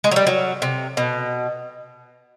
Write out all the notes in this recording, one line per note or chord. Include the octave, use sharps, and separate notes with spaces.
G#3
F#3
G3
F#3
C3
B2